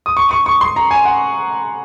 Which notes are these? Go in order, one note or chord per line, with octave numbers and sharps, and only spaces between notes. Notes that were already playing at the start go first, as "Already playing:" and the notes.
D#6
C#6
C#6
C#6
C6
A#5
G#5
F#5